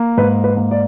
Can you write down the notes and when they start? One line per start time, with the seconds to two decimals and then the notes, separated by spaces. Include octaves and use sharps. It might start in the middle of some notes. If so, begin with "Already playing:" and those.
Already playing: A#3
0.17 G#2 B4
0.44 B4
0.57 A#3
0.71 D5